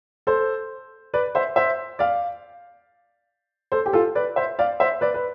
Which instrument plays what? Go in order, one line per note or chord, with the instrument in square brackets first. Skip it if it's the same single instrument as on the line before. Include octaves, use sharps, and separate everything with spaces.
[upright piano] A4 C5
B4 D5
C5 E5
C5 E5
D5 F5
A4 C5
G4
F4 A4
B4 D5
C5 E5
D5 F5
C5 E5
B4 D5
B4